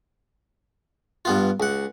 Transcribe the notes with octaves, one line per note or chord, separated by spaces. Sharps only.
G2 B3 F4
C#2 F#5